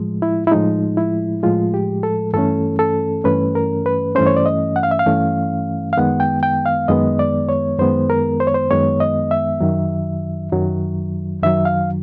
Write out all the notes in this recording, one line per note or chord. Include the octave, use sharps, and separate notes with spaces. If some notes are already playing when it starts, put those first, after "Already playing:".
Already playing: A2 F3 G#3
E4
E4
A2 F3 G#3 D#4
E4
A2 F3 G#3 F4
G4
A4
G2 E3 A3 C#4 A4
A4
G2 E3 A3 C#4 B4
A#4
B4
G2 E3 A3 C#4 C5
C#5
D5
D#5
F#5
F5
E5
F5
G2 E3 A3 C#4
F5
F#2 D#3 G#3 B3 F#5
G5
G5
F5
F#2 D#3 G#3 B3 D#5
D5
C#5
F#2 D#3 G#3 B3 C5
A#4
C5
C#5
C5
F#2 D#3 G#3 B3 C#5
D#5
E5
F#2 D#3 F#3
F#2 D#3 F#3
F#2 D#3 F#3 E5
F5